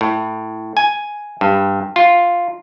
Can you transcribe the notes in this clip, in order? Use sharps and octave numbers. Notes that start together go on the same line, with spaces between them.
A2
G#5
G2
F4